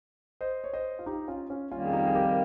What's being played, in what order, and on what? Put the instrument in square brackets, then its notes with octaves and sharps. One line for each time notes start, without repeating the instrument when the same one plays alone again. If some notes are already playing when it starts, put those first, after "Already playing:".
[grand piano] C5 D#5
C#5
C5 D#5
F4
D#4 G4
C#4 F4
C#4 F4
[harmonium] F2 D#3 G3 A#3 [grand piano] C#4 F4
[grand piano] G#4
D#4 G4
G#4
G4 A#4